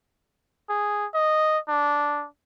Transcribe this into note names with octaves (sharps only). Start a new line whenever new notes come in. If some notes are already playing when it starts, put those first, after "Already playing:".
G#4
D#5
D4